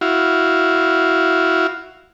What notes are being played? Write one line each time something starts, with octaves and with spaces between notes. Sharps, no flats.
E4 F#4 F5